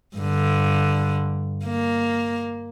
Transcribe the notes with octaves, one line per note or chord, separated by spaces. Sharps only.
G2 D3
A#3